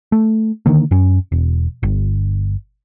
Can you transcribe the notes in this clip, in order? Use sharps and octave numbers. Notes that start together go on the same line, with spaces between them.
A3
D3 D#3 A#3
F#2 C#4
E1
G1